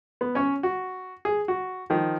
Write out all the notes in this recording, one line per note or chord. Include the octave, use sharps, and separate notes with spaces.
B3
C#4 C#5
F#4
G#4
F#4
D#3 F3